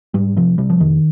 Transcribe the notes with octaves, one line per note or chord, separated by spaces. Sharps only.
G#2 G3
C3 F3
C3 G3
F3
F2 D#3